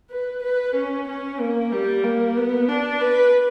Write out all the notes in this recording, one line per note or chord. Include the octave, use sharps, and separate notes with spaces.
B4
B4
C#4
C#4
A#3
G3
A#3
B3
D4
B4